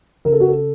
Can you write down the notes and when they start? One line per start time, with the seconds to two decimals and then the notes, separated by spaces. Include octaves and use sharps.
0.25 C#3 A#4
0.32 A4
0.40 F#4
0.48 A4